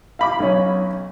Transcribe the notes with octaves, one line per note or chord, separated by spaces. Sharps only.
F5 B5 D6
B1 C#4